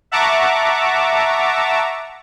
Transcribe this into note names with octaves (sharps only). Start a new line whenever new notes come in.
E5 F#5 A5 A#5 C#6 D6